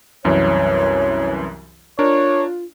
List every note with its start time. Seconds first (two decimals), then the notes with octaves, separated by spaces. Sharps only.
0.24 C2 F#2 E3 C#5
1.99 D4 F4 A#4 C#5